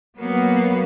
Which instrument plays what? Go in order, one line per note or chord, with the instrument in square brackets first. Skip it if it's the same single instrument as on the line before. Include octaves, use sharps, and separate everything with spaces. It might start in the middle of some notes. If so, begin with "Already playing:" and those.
[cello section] F#3 A#3 B3